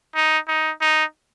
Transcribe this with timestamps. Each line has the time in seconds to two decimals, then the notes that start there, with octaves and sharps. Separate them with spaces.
0.15 D#4
0.48 D#4
0.81 D#4